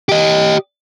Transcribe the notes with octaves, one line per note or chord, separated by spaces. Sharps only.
G4 D#5